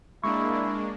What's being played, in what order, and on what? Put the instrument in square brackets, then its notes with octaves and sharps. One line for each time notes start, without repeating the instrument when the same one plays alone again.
[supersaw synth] G#3 A#3 D4 [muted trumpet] E4 [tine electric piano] C#6